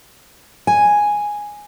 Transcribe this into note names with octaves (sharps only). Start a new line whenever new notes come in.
G#5